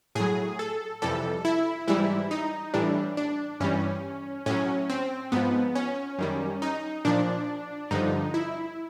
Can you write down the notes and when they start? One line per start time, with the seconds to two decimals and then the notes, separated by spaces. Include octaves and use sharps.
0.15 A2 F#3 G#4
0.59 A4
1.02 F2 C3 E3 G3 A4
1.45 E4
1.88 G#2 E3 G3 E4
2.31 D#4
2.74 A2 E3 G3 D4
3.17 D4
3.60 G2 E3 G3 C#4
4.46 A2 F#3 C#4
4.90 C4
5.32 G#2 F3 B3
5.75 C#4
6.19 F#2 D#3 G3
6.62 D#4
7.05 A#2 F3 D4
7.91 G2 D3 F3 D#4
8.34 E4